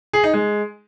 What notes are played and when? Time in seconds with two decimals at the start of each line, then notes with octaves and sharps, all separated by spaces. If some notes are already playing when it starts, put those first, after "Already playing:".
0.13 G#4
0.24 D#4
0.34 G#3